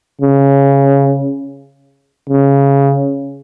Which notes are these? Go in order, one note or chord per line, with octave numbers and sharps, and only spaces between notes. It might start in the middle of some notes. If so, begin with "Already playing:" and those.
C#3
C#3